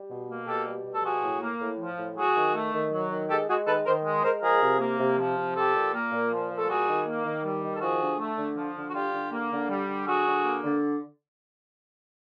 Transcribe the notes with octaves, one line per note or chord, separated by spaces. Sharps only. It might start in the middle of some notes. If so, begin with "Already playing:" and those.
Already playing: G3
B2
A#3
B2 G4 A4
G3
B2
A4
F3 F#4 G#4
A2
A#3
A2
F3
A2
F#3 F#4 G#4
D#3
A3
D#3
F#3
D#3
G#3 G4 A4
G#3 F#4 G#4
D#3 A4 B4
D#3 A#4 C5
G#3
G#3 A#4 C5
F3 G#4 A#4
C3
A#3
C3
F3
C3
F3 G4 A4
A#2
A#3
A#2
F3
A#2
A4
G3 F#4 G#4
D#3
A#3
D#3
G3
D#3
A4
F3 F#4 G#4
D3
A3
D3
F3
D3
F#4
G3 F4 G4
D3
A#3
D3
G3
D3
F#3 F#4 G#4
D3
A#3
D3